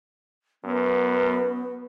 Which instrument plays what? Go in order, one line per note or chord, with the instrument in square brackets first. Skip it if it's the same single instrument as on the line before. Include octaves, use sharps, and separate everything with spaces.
[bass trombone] F#2 [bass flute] B3